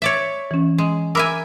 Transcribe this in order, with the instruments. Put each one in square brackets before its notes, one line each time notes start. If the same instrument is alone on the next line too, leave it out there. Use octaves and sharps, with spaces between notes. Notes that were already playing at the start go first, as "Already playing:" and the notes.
[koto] C#5 D5 E5
[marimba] E3 C#4
[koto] G#3
[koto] A#4 E5 G#5 [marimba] B5 D6 E6